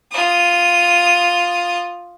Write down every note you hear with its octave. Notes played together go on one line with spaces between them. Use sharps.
F4 D#6